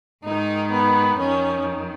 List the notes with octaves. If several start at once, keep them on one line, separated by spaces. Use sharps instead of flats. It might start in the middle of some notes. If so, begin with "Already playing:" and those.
G#2 D#3 D#4
B3
F2 D#3 C#4